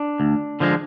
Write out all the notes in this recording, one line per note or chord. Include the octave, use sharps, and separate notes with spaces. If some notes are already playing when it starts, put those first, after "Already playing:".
Already playing: D4
D2
D3 F3 G#3